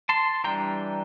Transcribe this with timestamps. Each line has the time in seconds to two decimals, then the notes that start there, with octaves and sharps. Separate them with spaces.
0.09 A5 C6
0.44 E3 G3 D4 G5 A#5